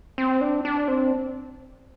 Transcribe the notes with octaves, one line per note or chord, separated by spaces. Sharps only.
C4
D4
D4
C4